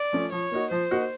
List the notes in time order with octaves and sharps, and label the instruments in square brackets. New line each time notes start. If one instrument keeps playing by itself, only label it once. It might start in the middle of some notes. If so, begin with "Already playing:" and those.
Already playing: [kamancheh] D5
[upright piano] F3 A3 C#4
[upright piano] F3 [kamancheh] C#5
[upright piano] A#3 D#4 F#4
[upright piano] F3 [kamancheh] C5
[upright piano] A#3 D#4 F#4